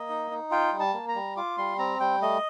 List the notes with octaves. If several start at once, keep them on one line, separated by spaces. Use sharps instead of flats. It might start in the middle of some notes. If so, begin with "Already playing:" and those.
Already playing: A#3 D#5
D#4
D#4
F4 G5
G3
A5
A#3
A#5
G3
F4 D6
G3 C6
C4 A#5
G3 G5
A3 D#5